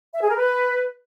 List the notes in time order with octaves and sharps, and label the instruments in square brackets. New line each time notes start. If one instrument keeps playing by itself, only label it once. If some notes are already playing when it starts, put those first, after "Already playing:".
[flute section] E5
G#4
A#4
B4